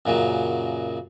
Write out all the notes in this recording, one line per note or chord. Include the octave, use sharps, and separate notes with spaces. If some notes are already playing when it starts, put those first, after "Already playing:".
F#2 A#2 C#3 F#3